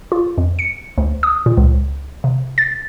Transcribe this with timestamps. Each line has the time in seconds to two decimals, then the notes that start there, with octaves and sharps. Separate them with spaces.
0.12 F4
0.38 F2
0.59 C#7
0.98 D2
1.23 D#6
1.46 A#2
1.57 C#2
2.24 C3
2.58 A6